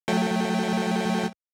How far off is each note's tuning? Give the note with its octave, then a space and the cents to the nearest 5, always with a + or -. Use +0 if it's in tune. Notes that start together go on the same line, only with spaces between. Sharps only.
F#3 -20 A3 +0 G5 +0